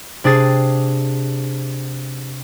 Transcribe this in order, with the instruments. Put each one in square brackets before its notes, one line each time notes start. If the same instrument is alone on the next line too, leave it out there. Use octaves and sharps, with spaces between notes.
[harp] C3 D4 G#4 A6 C7